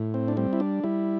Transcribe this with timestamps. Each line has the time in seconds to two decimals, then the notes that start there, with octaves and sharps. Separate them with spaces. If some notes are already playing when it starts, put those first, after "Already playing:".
Already playing: A2
0.14 C4
0.28 D4
0.37 G3 C4
0.53 E4
0.60 D4
0.84 G3 E4